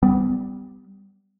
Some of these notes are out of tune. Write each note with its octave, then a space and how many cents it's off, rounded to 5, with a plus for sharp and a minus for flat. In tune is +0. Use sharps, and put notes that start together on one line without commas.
G3 +0 B3 +30